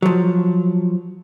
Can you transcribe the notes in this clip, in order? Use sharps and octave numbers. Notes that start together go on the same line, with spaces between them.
F3 F#3